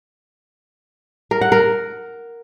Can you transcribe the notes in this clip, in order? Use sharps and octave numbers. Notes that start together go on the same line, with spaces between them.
A#4
F#5
A#4